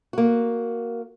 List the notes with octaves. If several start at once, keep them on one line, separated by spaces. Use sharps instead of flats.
A#3 F#4